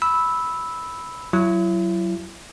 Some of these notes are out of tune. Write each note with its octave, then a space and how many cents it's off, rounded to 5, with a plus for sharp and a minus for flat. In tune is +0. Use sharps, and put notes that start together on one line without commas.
B5 +0 E6 -10
F#3 +15 E4 +35